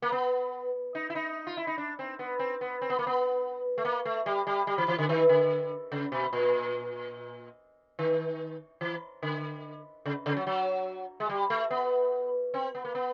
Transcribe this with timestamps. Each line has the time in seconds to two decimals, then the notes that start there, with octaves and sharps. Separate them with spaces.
0.02 A#3
0.12 B3
0.95 D#4
1.10 E4
1.15 D#4
1.47 F4
1.57 E4
1.67 D#4
1.78 D4
1.99 C4
2.19 B3
2.39 C4
2.61 B3
2.82 C4
2.90 B3
2.99 A#3
3.07 B3
3.78 A3
3.85 A#3
4.05 A3
4.26 G3
4.47 G3
4.67 G3
4.78 E3
4.88 E3
4.98 D3
5.09 D#3
5.29 D3
5.92 C#3
6.12 B2
6.33 A#2
7.99 D#3
8.81 E3
9.23 D3
10.06 C#3
10.26 C#3
10.37 F#3
10.47 F#3
11.20 G#3
11.29 G3
11.50 A3
11.71 B3
12.54 C4
12.75 B3
12.85 A#3
12.95 B3